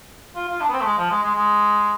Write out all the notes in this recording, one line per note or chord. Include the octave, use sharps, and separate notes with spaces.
F4
F4
D4
B3
C4
A3
G#3
F3
G#3
G#3
G#3